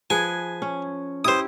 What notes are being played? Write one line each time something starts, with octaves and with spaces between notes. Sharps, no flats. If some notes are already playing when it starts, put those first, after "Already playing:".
F3 G#4 B4 G#5
C#4
E4 G4 C5 D#6